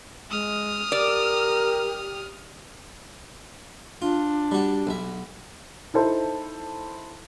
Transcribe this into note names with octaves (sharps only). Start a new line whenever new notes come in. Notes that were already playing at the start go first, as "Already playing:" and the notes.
G#3 D#6 F6
G4 A#4 D5
D4 F4
G3 F#4
B1 E5
D#4 E4 A4 C5